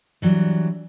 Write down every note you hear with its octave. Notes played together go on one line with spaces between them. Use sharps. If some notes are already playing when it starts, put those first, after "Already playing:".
E3 F#3 G3 D4